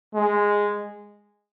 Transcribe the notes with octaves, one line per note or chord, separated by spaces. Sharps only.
G#3